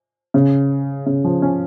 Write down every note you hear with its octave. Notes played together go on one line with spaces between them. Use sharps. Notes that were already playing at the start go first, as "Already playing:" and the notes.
C#3
C#3
F3
C#4